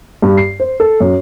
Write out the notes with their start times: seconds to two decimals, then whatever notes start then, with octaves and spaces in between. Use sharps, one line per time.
0.22 G2
0.37 C7
0.60 C5
0.80 A4
1.00 F#2